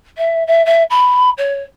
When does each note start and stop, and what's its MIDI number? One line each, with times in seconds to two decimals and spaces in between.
0.17 0.43 76
0.47 0.62 76
0.65 0.83 76
0.90 1.29 83
1.37 1.62 73